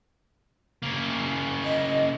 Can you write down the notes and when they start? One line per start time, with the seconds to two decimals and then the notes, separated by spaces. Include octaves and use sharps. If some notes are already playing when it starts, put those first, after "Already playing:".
0.82 C#3 A#3
1.64 D#5